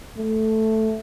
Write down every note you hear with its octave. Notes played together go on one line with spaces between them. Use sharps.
A3